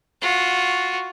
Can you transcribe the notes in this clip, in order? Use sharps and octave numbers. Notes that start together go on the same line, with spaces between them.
F4 F#4